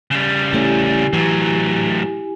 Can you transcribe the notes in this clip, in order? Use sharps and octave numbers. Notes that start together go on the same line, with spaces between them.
C#3 G3
A1 A3 C#4 E4 G4 G#5
A2 E3 F#3